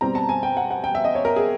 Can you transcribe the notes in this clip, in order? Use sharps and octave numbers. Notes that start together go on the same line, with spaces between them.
B2 G3 C4 A#5
A5
G#5
G5
F#5
F#5
G5
E5
D#5
C#5
A#4
G#4